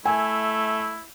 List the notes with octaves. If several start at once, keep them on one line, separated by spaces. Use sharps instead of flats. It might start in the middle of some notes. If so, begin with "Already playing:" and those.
A3 E4 G#5